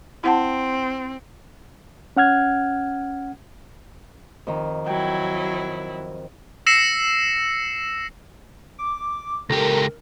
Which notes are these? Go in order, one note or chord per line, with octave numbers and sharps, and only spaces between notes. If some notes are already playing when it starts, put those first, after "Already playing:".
C4 E4 F#5 A5
C#4 F#5 F6 G#6
F2 D#3
F#3 E4 G5
E6 A#6 C7 C#7 E7
D6
C#2 G4 A4 A#4 A#5